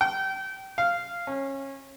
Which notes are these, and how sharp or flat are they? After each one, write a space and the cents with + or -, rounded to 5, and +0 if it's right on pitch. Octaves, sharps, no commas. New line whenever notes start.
G5 -30
F5 -10
C#4 -25